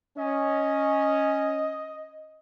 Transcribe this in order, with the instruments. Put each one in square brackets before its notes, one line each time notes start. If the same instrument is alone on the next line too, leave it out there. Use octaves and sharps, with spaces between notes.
[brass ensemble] C#4 [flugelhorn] D#5